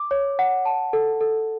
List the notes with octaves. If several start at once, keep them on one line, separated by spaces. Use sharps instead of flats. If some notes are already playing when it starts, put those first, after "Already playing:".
Already playing: D6
C#5
F#5
A5
A4
A4